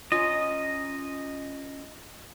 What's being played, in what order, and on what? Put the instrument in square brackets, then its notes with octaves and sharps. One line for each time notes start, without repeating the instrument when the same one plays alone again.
[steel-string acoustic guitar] C#4 F4 A#5 [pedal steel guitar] D#5